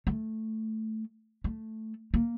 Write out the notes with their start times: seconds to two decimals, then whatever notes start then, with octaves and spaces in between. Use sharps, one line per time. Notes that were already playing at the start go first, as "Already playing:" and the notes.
0.07 A3
1.44 A3
2.14 A#3